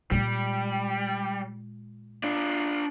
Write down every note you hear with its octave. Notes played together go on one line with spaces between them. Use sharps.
A#2 G3 G#3
D4 F4